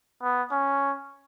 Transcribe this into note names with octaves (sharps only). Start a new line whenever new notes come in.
B3
C#4